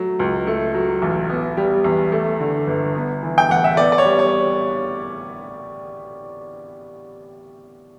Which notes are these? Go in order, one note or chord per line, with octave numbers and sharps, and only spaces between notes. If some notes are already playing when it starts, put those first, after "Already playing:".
Already playing: F#3 A3
C#2
A3
F#3
A1
B3
G3
E2
A3
D3
G1
B3
E3
G5
A1 F#5
E5
B3 D5
D5
C#5
G3
C#5